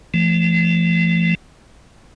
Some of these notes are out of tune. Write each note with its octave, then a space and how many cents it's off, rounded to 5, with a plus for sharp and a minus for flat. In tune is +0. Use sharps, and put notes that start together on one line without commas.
F3 -40 A3 +0